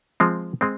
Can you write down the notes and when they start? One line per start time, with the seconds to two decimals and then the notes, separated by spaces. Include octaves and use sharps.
0.20 F3 G#3 C4
0.61 G#3 C4